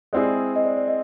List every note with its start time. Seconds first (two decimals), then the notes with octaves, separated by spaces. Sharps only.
0.13 G#3 C4 E4 G#4 D5
0.56 D#5
0.66 D5
0.77 D5
0.88 D#5